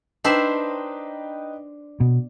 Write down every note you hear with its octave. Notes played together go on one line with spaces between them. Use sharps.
D4 D#4 B4 C5 E5 G5
B2